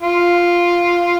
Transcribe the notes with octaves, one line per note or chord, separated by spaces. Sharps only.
F4